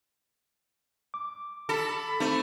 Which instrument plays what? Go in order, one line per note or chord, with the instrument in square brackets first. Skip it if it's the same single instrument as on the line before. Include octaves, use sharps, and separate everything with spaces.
[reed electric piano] D6
[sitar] A4 [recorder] B5
[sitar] A3 [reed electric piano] C4 D#4